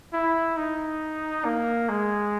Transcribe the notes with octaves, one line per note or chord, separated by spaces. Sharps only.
E4
D#4
A#3
G#3